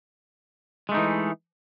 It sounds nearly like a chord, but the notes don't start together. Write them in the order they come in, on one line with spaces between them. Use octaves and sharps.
G#3 A3 D#4 E3